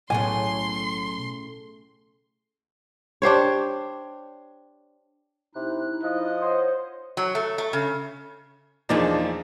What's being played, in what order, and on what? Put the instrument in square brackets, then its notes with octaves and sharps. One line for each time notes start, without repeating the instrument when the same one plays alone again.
[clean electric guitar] B1 [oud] A2 C#3 B3 [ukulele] G#5 [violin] C6
[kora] D4 G4 C5 C#5
[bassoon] C3 [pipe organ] D#4 E4 F#6
[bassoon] F3 [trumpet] D#5
[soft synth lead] C5 [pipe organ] C#5 F#5
[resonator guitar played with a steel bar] F#3
A3
A3
C#3
[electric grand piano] E2 F3 A#3 [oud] D4 D#4 G#4